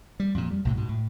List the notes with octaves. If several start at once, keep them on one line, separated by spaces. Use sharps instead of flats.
G3
F2 A#2
G3
B1 A2 C3
G#2 B2
A2